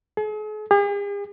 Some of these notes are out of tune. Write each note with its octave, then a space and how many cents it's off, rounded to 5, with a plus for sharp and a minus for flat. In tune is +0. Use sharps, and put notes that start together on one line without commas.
G#4 +45
G#4 -45